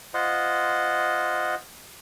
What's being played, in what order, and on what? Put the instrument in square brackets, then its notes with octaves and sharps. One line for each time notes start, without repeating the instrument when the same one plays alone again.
[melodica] F4 C5 D#5 F#5